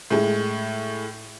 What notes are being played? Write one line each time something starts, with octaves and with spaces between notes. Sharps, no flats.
A2 G#3